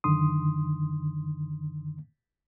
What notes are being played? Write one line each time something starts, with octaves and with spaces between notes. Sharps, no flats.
F#2 D3 D#3 C6 D#6